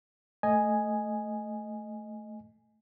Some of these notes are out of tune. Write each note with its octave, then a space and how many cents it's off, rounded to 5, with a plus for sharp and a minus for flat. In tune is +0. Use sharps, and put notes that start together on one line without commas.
A3 +0 D#5 +0 G#5 +0